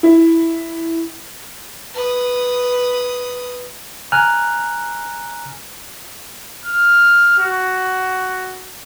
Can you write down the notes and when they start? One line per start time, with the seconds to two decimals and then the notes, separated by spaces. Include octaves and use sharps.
0.03 E4
1.94 B4 D#6
4.12 G#5 A#5 F6 F#6
6.66 F6
7.38 F#4